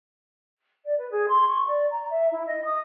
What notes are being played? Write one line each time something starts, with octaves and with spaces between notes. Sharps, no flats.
D5
B4
G#4
C6
C#6
D5
A#5
E5
E4
D#5
D#6